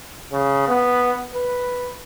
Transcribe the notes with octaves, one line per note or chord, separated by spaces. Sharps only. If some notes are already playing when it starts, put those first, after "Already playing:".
C#3
B3
B4